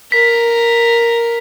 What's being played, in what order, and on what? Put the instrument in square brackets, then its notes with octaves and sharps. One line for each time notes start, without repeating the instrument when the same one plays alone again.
[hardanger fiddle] A#4 [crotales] B6